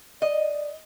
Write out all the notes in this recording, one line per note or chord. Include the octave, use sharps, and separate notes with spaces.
D5 D#5